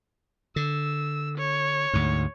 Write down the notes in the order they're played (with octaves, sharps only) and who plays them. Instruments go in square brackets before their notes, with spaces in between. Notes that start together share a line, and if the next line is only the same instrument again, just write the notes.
[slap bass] D3 [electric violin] E6
[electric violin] C#5
[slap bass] D2 G#2